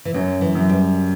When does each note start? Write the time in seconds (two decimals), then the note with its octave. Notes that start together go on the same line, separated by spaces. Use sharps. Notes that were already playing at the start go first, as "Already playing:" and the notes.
0.05 E3
0.14 F#2 F#3
0.41 E3
0.55 F#2
0.69 G3